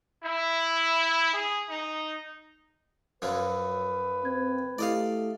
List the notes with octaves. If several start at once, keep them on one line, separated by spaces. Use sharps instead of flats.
E4
G#4
D#4
F#2 F3 F#3 B4
C4 G#6
A3 E4 G4 D5 D#5 F5